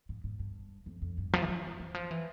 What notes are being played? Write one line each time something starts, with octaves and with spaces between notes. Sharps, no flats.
G#2
G#2
G2
F2
F2
G2
F3
E3
F3
E3
F3
E3